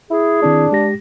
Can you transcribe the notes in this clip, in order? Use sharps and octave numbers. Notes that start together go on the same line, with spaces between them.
E4 G#4
D#3 C4 D4 E4
G#3 G4 A#6